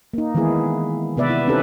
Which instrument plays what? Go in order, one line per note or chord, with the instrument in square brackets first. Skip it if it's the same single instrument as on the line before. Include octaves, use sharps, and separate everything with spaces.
[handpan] A#3 D#4
D#3 E3 G#3 B3 E4 G#4
C3 B3 B4 D5 E5
E4
C4 C#4 D#4 G4 A4 B4